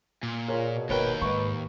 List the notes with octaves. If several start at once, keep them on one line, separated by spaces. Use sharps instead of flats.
A#2
F4 G#4 A#4 C#5
B2
G1 D#2 B2 A#4 B4 C#5 G5
G#2 B4 D#5 C#6